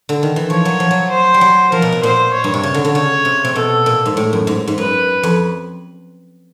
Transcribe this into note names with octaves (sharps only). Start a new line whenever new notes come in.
D3
D#3
E3
F3 C#5
F#3
F3
F#3
C5
G3
F#3
F3 A#4
B2
B2
A#2 C5
C#5
G2
C3
C#3
D3
D3
C#3 C#5
C3
C3
B2 A4
A#2
G#2
A2
F#2
G#2
G#2
F#2 B4
F2